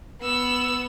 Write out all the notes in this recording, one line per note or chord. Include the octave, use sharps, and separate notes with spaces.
B3 E6